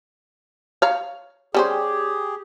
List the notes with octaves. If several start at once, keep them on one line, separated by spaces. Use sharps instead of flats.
C#5 F5 A#5
G3 C#4 G4 G#4 C5